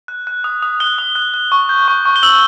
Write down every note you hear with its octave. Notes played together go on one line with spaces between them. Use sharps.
F#6
F#6
D#6
D#6
F#6 G7
D#6
F#6
F#6
C#6
G6
C#6
C#6
G7
E6 F#7